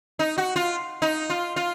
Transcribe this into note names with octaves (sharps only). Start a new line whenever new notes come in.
D#4
F#4
F4
D#4
F4
F4